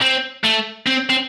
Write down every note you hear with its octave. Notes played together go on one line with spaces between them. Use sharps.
C4
A3
C4
C4